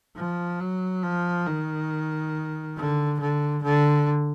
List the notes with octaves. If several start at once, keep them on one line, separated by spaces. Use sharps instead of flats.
F3
F#3
F3
D#3
D3
D3
D3